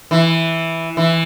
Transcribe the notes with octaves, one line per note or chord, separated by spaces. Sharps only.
E3
E3